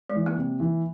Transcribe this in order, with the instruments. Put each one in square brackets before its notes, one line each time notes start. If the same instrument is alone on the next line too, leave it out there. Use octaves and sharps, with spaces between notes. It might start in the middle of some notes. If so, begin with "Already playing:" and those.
[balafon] G#3
[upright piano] E3
[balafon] A#3
[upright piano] C3
E3